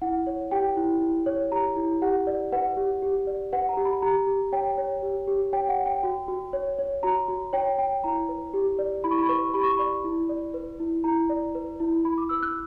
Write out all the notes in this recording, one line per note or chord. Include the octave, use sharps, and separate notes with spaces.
E4 F#5
C#5
G4 G5
E4
E4
C#5
G4 A#5
E4
G4 F#5
D5
B4 F#5
G4
G4
D5
B4 F#5
A#5
G4
B5
G4 A#5
G4
C#5 G5
C#5
G4
G4
C#5 G5
F#5
C#5
G5
F#4
F#4
C#5
C#5
F#4 A#5
F#4
C#5 G5
C#5 G5
E4 A#5
B4
G4
D5
E4 B5
C#6
B5
B4 C#6
G4 B5
C#6
B5
D5
E4
D5
B4
E4
E4 A#5
D5
B4
E4
E4 B5
D6
B4 E6
F#6